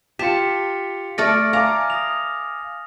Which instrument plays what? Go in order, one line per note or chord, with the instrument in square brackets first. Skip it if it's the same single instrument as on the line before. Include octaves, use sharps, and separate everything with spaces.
[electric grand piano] F4 G4 [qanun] A5 [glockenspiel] B6 C#7
[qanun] A3 D5 D6 [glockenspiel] F6 A6 A#6
[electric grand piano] F5 G#5 D6 [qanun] A#5
[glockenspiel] D#6 A#6 F7